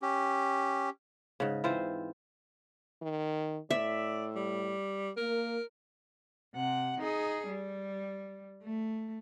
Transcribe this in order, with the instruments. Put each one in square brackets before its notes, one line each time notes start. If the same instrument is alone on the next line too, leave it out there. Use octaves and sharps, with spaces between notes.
[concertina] C#4 G4
[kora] G#2 C#3
E3 C4 F4 C5
[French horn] D#3
[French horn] A2 [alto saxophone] D5 [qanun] E5
[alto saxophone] G3
[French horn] A#3 [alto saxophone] A#4
[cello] C3 F#5
D#4 G#4
G3
A3